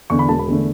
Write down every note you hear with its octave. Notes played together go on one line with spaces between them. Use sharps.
E2 D3 C#6
B5
E1 A5
B5
E2 D3 A3